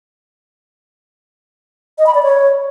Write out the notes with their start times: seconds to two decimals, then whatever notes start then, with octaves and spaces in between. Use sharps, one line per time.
1.98 D#5
2.07 B5
2.15 D5
2.23 C#5